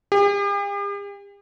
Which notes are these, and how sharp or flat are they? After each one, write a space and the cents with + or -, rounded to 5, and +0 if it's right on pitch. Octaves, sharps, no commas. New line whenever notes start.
G4 +45